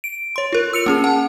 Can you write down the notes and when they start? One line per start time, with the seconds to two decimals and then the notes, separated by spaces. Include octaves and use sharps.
0.04 D7
0.36 C#5 C6
0.53 F4 A#4
0.73 E6 C#7 F7
0.86 A#3 C#4 G#4
1.04 F#5 A5